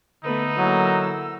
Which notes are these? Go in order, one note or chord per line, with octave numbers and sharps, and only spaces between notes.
D3 A3 B3 D#4 B4 E6
F#3 A#3 E4